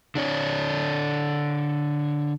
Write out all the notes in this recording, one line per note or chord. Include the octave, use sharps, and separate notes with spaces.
D3 D4 C#5